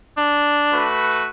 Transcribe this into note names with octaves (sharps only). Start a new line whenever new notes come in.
D4
A3 F#4 B4